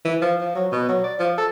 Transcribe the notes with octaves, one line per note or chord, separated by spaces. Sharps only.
E3
F3
F3
F#3
B2
F#3
D5
F3
A4